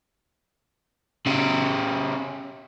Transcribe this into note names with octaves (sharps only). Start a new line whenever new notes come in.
C#3 G4